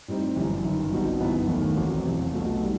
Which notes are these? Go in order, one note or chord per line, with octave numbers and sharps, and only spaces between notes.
A2 G3 C4 D#4
G1 F#2 E3 G3
G1 F#2 D#3
B1 B2 G3 C4 D#4
G1 F#2 E3 B3 D#4
D#2 D#3 A3
A1 A2 F#3 C4
E1 E2 C3
B1 B2 A3
D#3 G3